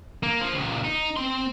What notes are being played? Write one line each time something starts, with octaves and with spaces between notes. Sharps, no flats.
A#3
F3
C#2 A#2
D#4
C4 C6